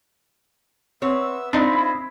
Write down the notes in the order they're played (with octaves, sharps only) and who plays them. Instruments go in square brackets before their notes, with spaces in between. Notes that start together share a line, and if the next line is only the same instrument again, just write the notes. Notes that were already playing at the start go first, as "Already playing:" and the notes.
[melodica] B3 E5 E6 [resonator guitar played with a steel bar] C4 C#5
[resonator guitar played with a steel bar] C4 [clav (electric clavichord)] D4 D#4 [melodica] F4 C5 D#5 [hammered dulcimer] B5
[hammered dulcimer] E4